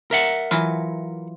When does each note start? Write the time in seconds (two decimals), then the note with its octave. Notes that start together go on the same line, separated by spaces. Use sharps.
0.11 A#4 E5 F#5
0.51 E3 F#3 F4